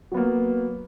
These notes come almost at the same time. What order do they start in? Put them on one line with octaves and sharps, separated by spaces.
F#3 B3 A#3